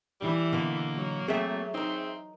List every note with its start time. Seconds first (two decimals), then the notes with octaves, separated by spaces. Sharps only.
0.21 E3 G3 E4
0.52 B2 D3 A#3
0.94 F#3
1.28 A3 A#3 C4 G#4 E5
1.74 C4 D#4 A#4